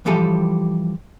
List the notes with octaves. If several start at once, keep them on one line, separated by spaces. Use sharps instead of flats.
E3 F3 G3 G4 A4 G#5